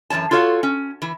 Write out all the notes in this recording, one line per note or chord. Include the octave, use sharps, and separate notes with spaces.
F#2 E3 G#3 C#5 A5
F4 F#4 A4 C#5 F5
C#4
E3 E4